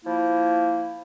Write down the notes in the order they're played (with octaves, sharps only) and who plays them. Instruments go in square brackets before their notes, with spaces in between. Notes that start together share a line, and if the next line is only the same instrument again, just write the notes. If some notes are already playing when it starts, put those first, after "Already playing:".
[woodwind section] F3 A#3 E4